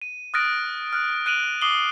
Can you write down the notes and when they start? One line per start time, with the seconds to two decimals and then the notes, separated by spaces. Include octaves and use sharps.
0.02 D#7
0.34 D#6 F6 F#6 A6 A#6 D7
0.93 F6 F#6
1.26 F#6 D7 D#7 F7 F#7
1.61 D6 D#6 C7 F#7 G7